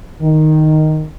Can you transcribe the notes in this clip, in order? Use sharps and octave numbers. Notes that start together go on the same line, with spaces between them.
D#3